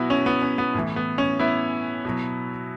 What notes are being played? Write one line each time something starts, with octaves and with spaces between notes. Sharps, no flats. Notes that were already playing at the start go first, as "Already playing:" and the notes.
Already playing: B2 F#3 B3 E4 F#4
C#4
B3
C#4
B3
A2 E3
B3
C#4
B3 E4
B2 F#3